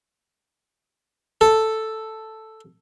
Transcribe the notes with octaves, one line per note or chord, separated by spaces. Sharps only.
A4